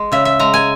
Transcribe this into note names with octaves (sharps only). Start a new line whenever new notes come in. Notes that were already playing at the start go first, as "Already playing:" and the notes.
Already playing: G#3
C#3 E5
E5
G#3 A#5
G#5